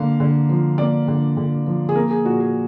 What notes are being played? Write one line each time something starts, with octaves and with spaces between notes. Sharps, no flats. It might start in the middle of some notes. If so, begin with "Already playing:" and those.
Already playing: D3 A#3 F5
D3
F3
A#3 D5
D3
D3
F3
G#4
A#3 A#4
G#4
A#2 F#4
G#4